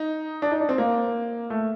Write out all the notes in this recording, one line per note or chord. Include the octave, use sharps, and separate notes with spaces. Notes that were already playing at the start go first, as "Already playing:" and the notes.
Already playing: D#4
D4
D#4
D4
C4
A#3
A3